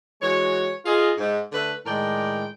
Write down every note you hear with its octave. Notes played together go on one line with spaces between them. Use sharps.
E3 G#3 F#4 C#5
F4 G#4 D#5
G#2
D3 A3 B4
A2 D#3 G#3 A#4 D5 G5